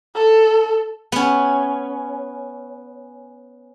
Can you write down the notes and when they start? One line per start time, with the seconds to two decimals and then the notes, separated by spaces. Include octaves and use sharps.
0.15 A4
1.12 B3 C#4